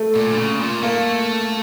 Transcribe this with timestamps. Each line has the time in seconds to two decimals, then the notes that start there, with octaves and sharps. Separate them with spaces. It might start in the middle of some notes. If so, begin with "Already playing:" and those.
Already playing: A3
0.15 A#2
0.30 D3
0.38 C#3
0.60 A#2
0.83 A3 A#3